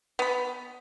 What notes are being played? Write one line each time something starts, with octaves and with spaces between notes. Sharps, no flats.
B3 B5